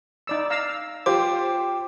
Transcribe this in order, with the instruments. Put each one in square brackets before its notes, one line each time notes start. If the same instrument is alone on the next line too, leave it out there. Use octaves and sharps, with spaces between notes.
[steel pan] D#4 D5 E6
F5 A#5 E6
[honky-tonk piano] F4 G4 C5 [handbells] D6